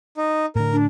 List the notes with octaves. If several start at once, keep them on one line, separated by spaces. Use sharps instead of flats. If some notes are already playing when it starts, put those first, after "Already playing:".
D#4
A2 D3 A#4
D4